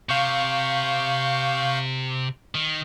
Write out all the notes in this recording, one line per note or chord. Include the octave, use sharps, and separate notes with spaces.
C3 F5 C#6 G6
D#3